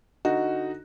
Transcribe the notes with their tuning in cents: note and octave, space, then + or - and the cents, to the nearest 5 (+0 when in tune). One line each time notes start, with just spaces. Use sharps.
D3 +10 D#4 +0 F#4 +0